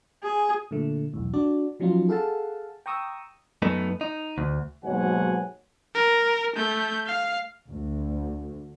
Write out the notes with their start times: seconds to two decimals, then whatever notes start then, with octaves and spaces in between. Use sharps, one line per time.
0.23 G#4
0.71 A#2 D3 A3
1.14 B1 E2 A2
1.34 D4 F#4 D5
1.80 F3 F#3 C#4 D#4 F4
2.09 G#4 A4 F5 F#5 A5
2.86 G5 A#5 C#6 D#6 E6
3.62 F#2 A3 B3 D#4
4.01 D#4
4.38 D2
4.84 D#2 G#2 B2 F#3 F#5 G#5
5.94 A#4
6.56 A3 G6
7.06 F5
7.71 D2